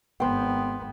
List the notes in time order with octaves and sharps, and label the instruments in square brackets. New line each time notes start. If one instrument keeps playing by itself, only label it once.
[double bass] G#1 B3 [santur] C5 G5